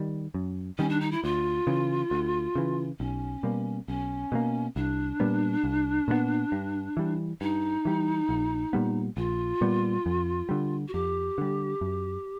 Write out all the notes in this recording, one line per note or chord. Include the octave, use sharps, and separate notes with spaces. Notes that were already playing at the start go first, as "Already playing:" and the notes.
Already playing: D#3 G3
F#2
D#3 G3 C#4
D4
D#4
E4
D2 F4
C#3 E3
D2
C#3 E3
B1 C#4
B2 G3 A#3
B1 C#4
B2 G3 A#3
C2 D4
A#2 G3 B3
C2
A#2 G3 B3
G2
E3 G3
G2 D#4
E3 G3
A#1
A#2 G3 B3
A#1 F4
A#2 G3 B3
F2
D3 G3
F#4
F2 G4
D3 G3
F#2